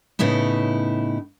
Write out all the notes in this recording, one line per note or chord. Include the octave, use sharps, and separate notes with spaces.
A2 C#3 B3 D#4 E4